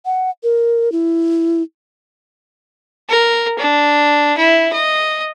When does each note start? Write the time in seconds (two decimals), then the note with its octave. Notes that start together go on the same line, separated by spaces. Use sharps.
0.05 F#5
0.43 A#4
0.92 E4
3.09 A#4
3.59 D4
4.38 E4
4.74 D#5